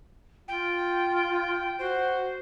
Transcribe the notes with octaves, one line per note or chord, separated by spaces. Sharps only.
F4 G5
F#4 C5